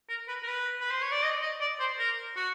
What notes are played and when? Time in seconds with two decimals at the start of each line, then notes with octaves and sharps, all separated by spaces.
0.09 A#4
0.28 B4
0.43 A#4
0.48 B4
0.81 B4
0.91 C5
1.02 C#5
1.12 D5
1.23 D#5
1.42 D#5
1.61 D5
1.80 C5
1.99 A#4
2.36 F#4